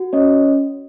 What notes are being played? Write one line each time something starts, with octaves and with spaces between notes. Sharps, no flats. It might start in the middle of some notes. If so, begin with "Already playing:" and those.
Already playing: F#4
C#4 C#5 D#5